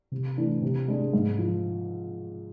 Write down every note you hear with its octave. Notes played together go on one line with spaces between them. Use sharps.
C3
E3 A3 D4
C3
G#3 D4 G#4
G#2
F3